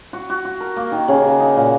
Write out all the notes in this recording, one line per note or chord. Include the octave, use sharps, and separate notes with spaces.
F#4
F#4
F#4
A#4
A#3
D#3
C#3
C#3
D#4
A#2